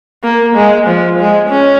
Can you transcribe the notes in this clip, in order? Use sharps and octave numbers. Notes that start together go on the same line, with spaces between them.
A#3
G#3
F3
G#3
C#4